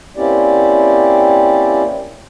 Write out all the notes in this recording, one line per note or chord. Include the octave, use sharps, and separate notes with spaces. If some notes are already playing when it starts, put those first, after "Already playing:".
A#3 C4 C#4 E4 G4 D5